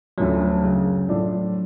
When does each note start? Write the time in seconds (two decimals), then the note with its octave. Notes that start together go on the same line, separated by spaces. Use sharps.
0.18 D2 D3 F3 F#3 A3 C#4
0.63 F#2 C#3 G#3
1.09 A2 F3 A3 D4